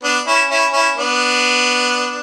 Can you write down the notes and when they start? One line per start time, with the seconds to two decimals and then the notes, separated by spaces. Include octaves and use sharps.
0.03 B3 D4
0.27 C#4 E4
0.50 C#4 E4
0.73 C#4 E4
0.97 B3 D4